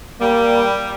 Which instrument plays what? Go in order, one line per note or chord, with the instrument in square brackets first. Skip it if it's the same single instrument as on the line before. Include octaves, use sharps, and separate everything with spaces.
[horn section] G3 [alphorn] A#3